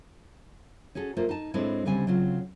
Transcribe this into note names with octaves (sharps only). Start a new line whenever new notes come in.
C#4 F#4 G#4 A4
A3 A#3 F4 C5
D#4 A5
A2 G#3 C4 D4 E4 A4
D2 C#3 G3 C4 G#5
C#3 F#3 C4 F4